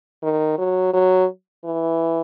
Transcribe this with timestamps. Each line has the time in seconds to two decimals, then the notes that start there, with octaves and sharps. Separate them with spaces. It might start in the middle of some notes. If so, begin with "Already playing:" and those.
0.23 D#3
0.59 F#3
0.94 F#3
1.64 E3